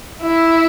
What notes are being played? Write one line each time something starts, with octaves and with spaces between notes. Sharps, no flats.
E4